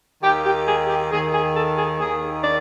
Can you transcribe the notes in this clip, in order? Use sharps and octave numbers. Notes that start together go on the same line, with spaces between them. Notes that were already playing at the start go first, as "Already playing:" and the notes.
D#2 D#3 G4
G4
G#4
G4
D#2 D#3 G#4
G#4
A4
G#4
D#2 D#3 G#4
D5